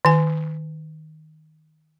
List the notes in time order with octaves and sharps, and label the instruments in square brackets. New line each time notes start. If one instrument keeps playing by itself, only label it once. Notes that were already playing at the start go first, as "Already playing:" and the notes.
[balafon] D#3 G#5